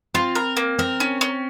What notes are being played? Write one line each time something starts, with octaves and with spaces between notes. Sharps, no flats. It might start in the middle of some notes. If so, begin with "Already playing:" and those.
C4 F4
A#4
A#3
C4 A#4
C#4
C#4